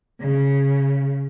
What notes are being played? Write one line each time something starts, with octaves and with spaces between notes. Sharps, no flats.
C#3